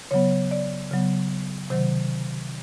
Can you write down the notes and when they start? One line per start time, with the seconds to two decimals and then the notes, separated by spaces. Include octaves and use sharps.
0.11 C#3 F#3 B3 C#5
0.51 D5
0.91 C#3 F#3 B3
1.70 C3 D#3 F#3 C5